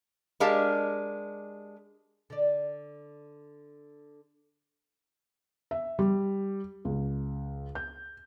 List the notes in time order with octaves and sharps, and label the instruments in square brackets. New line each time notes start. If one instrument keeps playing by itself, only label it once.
[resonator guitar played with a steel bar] G#3 D4 G4 A#4 F5 A5
[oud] D3 D5
[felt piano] E5
G3
C#2
G6